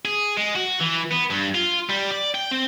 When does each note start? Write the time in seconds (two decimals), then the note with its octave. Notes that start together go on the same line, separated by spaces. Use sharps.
0.05 G#4
0.37 G#3
0.55 F#4
0.80 E3
1.11 B3
1.30 G2
1.55 F4
1.90 G3
2.11 D5
2.34 G5
2.51 C4